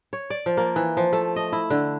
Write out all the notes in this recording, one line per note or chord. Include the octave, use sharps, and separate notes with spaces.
C#5
D5
F3
A#3
E3
F3
A3
D#5
E4
D3